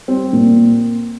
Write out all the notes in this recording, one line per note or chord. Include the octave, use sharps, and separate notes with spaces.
G3 C4
A#2
A#3